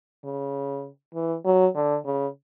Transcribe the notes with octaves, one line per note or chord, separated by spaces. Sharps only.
C#3
E3
F#3
D3
C#3